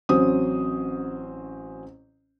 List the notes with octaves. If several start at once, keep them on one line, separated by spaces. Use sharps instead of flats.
A1 F#3 C4 C#4 C5 D#6